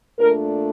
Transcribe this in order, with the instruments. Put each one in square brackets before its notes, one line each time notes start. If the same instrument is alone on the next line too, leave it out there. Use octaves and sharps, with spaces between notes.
[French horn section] A#2 A3 D4 A#4